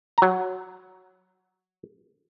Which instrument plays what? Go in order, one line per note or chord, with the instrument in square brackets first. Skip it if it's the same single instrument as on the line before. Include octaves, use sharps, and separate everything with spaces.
[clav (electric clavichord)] F#3 A#5